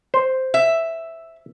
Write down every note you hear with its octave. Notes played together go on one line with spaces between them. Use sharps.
C5
E5